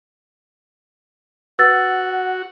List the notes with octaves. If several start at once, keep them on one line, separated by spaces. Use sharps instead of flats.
F#4 B4 F#5 E6 A6